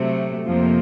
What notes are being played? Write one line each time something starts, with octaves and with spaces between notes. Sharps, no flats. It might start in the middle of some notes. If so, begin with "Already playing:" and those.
Already playing: C3 F#3 A3
F2 C3 F3 A#3